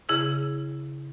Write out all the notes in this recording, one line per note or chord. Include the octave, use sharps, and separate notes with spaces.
C#3 E4 G#4 E6